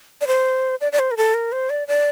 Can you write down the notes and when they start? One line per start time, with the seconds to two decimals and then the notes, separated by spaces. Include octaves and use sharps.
0.21 D5
0.27 C5
0.81 D5
0.92 D5
0.99 C5
1.11 A#4
1.17 A4
1.34 A#4
1.52 C5
1.70 D5
1.88 D5